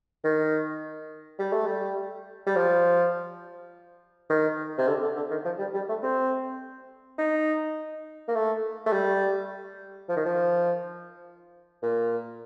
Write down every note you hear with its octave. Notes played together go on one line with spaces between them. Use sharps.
D#3
G3
A3
G3
G3
F3
D#3
C3
D3
D3
D3
D#3
F3
G3
G3
A3
C4
D#4
A#3
A3
A3
G3
F3
D#3
F3
A#2